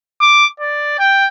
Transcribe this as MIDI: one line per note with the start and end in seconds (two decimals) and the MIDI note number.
0.21 0.46 86
0.60 0.98 74
0.99 1.28 79